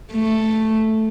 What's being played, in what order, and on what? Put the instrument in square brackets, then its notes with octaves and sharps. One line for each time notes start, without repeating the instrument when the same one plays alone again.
[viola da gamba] A3